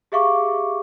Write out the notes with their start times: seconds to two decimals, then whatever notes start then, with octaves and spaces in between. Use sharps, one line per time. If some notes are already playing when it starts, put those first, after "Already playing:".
0.12 G4 G#4 E5 F5 C#6 D6